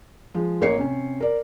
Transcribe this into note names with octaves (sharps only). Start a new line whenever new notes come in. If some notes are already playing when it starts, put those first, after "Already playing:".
F3 G#3
A1 A#3 C#5 C7 C#7
C3 C#4
A#4 D5